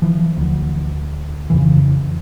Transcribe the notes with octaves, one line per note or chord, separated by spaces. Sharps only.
E3 F3
D2
F2 C#3 E3